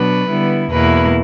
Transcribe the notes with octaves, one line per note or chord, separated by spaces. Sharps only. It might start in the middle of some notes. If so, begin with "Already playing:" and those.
Already playing: B2 F#3 B3 D4 B4
D3 G3 B3 E4
E2 B2 A#3 E4 B4